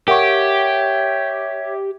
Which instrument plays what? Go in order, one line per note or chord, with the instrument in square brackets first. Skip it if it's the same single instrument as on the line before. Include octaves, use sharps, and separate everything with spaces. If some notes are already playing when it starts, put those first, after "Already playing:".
[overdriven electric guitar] G4 [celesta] A#4 F#5 C#6 [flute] C#5 [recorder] E5